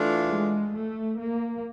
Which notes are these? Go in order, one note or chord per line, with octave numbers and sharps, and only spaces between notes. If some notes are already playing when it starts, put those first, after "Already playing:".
Already playing: E3 A3 D4 F4
G#3
A3
A#3